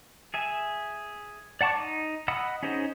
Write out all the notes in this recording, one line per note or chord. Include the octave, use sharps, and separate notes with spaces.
G#4 E5 G#5
D5 F#5 A5 C#6 D6
D#4
D#5 F#5 B5 D#6 E6
C#4 D#4 G#4 C5 D#5